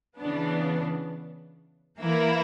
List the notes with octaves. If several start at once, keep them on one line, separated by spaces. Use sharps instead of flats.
C#3 E3 B3 D4
E3 A#3 E4 A#4